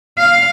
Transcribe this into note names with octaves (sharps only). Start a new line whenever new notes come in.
F5